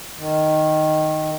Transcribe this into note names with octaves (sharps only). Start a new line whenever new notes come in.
D#3